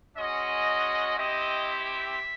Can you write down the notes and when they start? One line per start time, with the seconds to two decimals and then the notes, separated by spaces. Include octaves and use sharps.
0.18 G#3 C#4 F#4 D#5
1.18 C4 E4 G4 D#5
1.70 E5